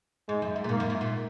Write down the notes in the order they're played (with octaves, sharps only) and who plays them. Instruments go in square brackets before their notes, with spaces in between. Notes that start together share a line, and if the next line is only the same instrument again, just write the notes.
[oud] G#2 [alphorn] G#3
[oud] F#2
G#2
A#2
[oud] G#2 [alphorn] A#3
[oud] F#2
G#2
A#2